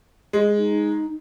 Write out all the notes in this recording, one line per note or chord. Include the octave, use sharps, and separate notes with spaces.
G#3
D#4